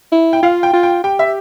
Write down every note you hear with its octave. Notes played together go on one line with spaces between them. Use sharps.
E4
G5
F4 F5
G5
F4
G5
G4 G5
E5